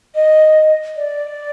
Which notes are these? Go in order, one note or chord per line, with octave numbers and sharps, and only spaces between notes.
D#5
D5